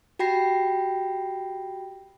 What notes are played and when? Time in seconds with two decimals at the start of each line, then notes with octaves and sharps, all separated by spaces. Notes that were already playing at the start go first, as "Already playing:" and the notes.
0.19 F#4 G4 G5 B5 A#6 C7